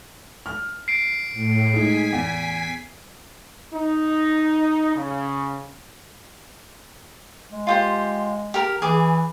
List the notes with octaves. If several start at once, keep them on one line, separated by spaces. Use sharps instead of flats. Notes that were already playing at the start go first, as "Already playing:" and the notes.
F6
C7 D7
A2
G#3 D#4 G#5 B6
E2
D#4
C#3
G#3
F4 G4 C5
G4 A#4
E3 G#4 D6